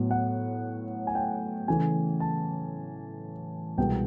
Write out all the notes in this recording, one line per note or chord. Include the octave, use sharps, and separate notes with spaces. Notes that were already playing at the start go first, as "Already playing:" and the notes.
Already playing: A2 F#3 B3
F#5
G#5
G5
C#3 E3 A3 G#5
A5
C2 B2 G#3 B3 G5